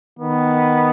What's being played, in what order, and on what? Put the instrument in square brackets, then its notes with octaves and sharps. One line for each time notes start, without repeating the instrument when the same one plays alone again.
[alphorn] D#3 [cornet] B3